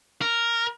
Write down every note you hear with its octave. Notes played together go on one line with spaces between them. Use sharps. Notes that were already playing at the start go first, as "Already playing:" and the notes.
A#4